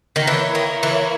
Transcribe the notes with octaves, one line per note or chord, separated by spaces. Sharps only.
D#3
E3 A#3 E4 A#4 C#5
D#3
E3